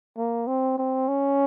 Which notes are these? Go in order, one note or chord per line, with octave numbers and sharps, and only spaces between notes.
A#3
C4
C4
C#4